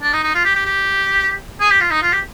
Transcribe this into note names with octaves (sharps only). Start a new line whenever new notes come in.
D4
D#4
D#4
F4
G4
G4
G4
G#4
G4
F4
D#4
F4
G4